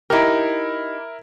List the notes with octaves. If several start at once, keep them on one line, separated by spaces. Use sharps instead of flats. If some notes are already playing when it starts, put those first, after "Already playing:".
D#4 E4 G4 A#4